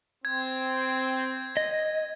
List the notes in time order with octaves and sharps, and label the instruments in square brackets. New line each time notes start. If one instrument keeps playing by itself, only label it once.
[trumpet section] C4 [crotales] G#6
[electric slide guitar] D#5